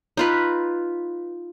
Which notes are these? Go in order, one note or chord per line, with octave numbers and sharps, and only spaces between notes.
D#4 F4 B4